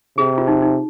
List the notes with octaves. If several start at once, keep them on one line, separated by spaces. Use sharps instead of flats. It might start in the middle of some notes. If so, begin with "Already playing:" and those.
C3 G#4
F4
D#4
D#4